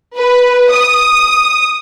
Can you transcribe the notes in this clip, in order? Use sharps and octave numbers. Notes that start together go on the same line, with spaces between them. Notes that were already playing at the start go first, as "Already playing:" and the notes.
B4
D#6